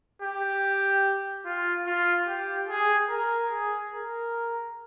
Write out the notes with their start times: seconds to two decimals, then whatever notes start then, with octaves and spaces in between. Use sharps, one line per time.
0.22 G4
1.45 F4
1.86 F4
2.27 G4
2.68 G#4
3.09 A#4
3.50 G#4
3.90 A#4